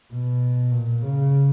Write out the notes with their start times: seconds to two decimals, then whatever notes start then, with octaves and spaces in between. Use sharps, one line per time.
0.13 B2
0.72 A#2
1.02 C#3